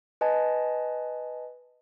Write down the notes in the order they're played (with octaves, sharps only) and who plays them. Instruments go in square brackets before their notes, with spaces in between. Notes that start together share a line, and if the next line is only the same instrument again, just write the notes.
[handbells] B4 D#5 G#5 A5